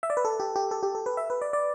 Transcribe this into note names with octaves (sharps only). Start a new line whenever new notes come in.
E5
D5
B4
A4
G4
G4
A4
G4
A4
B4
E5
B4
D5
D5